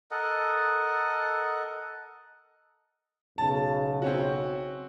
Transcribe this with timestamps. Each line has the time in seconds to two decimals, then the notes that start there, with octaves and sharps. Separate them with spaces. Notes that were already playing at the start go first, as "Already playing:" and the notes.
0.11 A4 A#4 D#5 F#5
3.38 B1 C#3 A5
4.02 C4 C#4 F#4